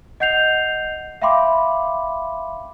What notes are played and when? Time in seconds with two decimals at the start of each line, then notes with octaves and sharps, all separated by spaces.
0.20 D#5 F#5 G6 C7 F7
1.22 E5 F5 G5 B5 C6 D6